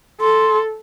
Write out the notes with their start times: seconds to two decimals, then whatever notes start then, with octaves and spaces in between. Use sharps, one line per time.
0.21 A4 C6